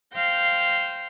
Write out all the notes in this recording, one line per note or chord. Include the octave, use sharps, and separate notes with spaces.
C5 F5 G5 G6 A#6